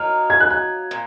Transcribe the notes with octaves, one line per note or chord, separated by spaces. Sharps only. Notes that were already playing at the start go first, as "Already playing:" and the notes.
Already playing: F#3 A#3 D#4 F6
G#6
F#6
F#6
A#2